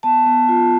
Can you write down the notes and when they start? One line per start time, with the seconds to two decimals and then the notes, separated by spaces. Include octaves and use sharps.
0.03 B3 A5
0.26 B3
0.48 F4